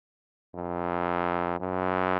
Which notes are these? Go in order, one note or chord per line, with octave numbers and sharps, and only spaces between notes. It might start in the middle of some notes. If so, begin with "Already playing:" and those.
F2
F#2